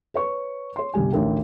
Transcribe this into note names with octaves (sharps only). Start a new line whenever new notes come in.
B4 C#5 C#6
C#5 C6
G1 C2 G3 G4 G#5
A1 D2 D#3 A#4 G5